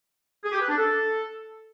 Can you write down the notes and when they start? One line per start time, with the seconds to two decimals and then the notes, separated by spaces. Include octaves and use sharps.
0.44 G#4
0.52 G4
0.61 B4
0.69 D4
0.77 A4